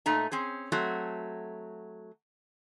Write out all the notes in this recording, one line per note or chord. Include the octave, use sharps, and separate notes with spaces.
A#2 A3 D#4 A#5
C4 C#4 G#4
F#3 A3 C4 F#4